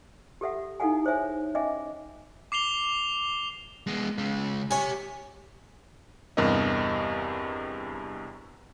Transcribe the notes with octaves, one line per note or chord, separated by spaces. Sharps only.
G4 A4 E5 F#5
D#4 E4 A4 F5 F#5 G#5
G#4 C5 C#5 E5 G#5
C#4 D#5 E5 G#5 D6
D6 C7 F7 G7
G#3 B3
C#3 G#3
G4 C#5 E5 G#5
E2 G2 C3 A#4 D#5